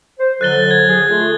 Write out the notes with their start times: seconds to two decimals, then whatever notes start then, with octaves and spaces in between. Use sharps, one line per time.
0.19 C5
0.41 F2 D3 F#3 F#6 A6 G7
0.71 G#6
0.89 G#4
1.10 A3 F4